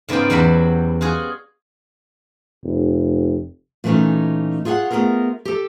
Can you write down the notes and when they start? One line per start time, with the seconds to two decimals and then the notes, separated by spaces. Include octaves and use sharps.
0.09 G#2 C#3 B3 F4 D5 G5
0.30 E2 F#3 G3 F#4 C5 B5
1.01 F4 F#4 G#4 F#5
2.63 F1
3.84 A#2 E3 A3 A#3 C#4 D#4
4.65 F4 G#4 C#5 D#5 F#5
4.91 A3 B3 C#4 F4 G#4 A#4
5.45 G4 A4